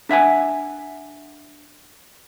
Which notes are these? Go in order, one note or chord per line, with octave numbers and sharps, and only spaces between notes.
D4 E5 F#5 G#5